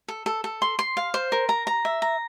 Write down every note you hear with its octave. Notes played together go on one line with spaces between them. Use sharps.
A4
A4
A4
C6
C6
F5
C5
A#4
A#5
A#5
E5
A#5